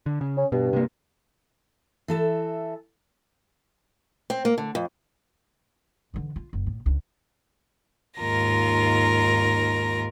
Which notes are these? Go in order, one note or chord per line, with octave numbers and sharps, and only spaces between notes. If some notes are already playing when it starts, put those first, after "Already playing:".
D3
C#3
C#4
G2 B2
C3 A#3
E3 A4 E5
C4
A#3
D3
F2
D3 E3
F4
F#1
A2
C#2 D3
D#2 G#2 F4 A#4 A#6